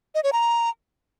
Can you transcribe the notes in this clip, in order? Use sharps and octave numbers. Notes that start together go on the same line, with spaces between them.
D#5
C#5
A#5